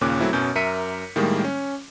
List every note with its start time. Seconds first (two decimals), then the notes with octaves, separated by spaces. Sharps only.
0.01 D#2 A#2 C#3 C#4 D6 F#6
0.20 F#3 A3 C4 E4
0.33 F#2 B2 C#4 G6
0.55 F#2 A#4 E5 B6 C#7 D#7
1.16 A2 D#3 G3 G#3 A#3
1.44 C#4